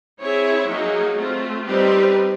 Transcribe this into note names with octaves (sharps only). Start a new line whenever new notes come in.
C4 E4 G#4 C#5 E5
F#3 A#3 D#4 G#4
A3 C4 F4
G3 C4 D#4 G4 B4